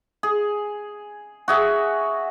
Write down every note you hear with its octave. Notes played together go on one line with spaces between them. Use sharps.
G#4
F#4 G#4 E5